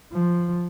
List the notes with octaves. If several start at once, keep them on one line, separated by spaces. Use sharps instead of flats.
F3